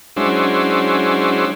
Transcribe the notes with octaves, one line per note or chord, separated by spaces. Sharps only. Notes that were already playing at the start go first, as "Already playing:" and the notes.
F#3 G#3 C#4 D4 E4 C5